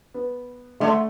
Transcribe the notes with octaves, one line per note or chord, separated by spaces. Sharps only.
B3
D3 A3